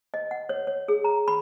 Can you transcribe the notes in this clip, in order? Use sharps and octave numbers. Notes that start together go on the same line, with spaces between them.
D#5
F#5
C#5
C#5
G#4
A#5
B5